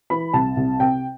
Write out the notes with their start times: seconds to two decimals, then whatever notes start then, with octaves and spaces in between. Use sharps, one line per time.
0.10 E3 B5
0.33 C2 A5
0.57 C2
0.80 C3 G5